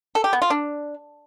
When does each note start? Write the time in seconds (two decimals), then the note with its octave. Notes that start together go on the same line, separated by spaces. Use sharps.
0.15 A4
0.24 G4
0.33 B3
0.42 F4
0.50 D4